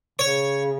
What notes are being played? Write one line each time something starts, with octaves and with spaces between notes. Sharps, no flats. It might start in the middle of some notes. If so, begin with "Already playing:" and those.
C#3 C#5